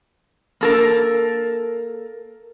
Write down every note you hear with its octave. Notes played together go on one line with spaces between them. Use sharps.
A#3 A4 A#4